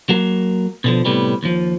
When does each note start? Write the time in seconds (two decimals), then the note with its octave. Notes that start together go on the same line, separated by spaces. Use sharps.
0.09 F#3 A#3
0.84 B2 D3 F3
1.05 A2 C3 G3 B3
1.43 D#2 F3